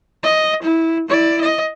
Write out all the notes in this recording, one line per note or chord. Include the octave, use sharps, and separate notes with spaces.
D#5
E4
E4 D5
D#5